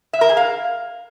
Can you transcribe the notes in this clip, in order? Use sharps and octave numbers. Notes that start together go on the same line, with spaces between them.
E5
A#4
G#4
F5